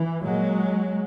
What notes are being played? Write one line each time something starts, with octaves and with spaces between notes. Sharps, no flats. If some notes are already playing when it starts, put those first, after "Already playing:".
Already playing: E3
A#2 F#3 G#3